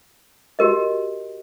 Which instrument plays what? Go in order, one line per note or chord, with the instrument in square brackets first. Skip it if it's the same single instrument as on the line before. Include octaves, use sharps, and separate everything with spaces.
[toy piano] F#4 G4 A#4 D#5